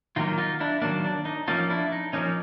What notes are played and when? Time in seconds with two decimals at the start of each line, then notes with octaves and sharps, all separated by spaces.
0.16 D#3 F#3 A#3 D#4 F4
0.38 D#4 F4
0.60 D4 E4
0.82 D#3 F#3 A#3 D4
1.05 D4
1.25 D#4
1.48 F3 A#3 C#4 D#4 F4
1.70 D4 E4
1.92 D#4
2.13 F3 A#3 C#4 D#4